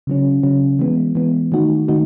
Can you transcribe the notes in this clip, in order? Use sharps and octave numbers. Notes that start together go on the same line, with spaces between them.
C#3 F#3 C#4
C#3 F#3 C#4
E3 G#3 B3
E3 G#3 B3
D#3 A3 D#4 F#4
D#3 A3 D#4 F#4